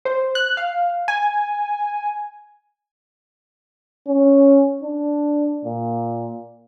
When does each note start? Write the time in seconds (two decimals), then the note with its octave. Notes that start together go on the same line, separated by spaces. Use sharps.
0.05 C5
0.35 F#6
0.57 F5
1.08 G#5
4.08 C#4
4.83 D4
5.65 A#2